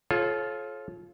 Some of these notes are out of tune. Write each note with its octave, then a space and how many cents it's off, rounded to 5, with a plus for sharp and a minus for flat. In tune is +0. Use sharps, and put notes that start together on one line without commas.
F4 +0 A4 -35 C#5 -30